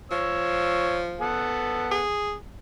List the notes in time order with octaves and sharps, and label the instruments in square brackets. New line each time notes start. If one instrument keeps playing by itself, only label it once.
[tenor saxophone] F3 [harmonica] C#5 E6
[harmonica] B3 A4 F#5
[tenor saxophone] G#4